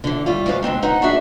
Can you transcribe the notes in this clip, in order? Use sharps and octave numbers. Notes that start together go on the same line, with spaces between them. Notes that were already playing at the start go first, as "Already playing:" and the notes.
D3 E3
G3 A3 F4
D2 G#3 F#4 B4 C5 F5
D3 G#3 C4 D#4
D#4 B4 C5 F#5
D4 F#4 G#4 B4 D5 E5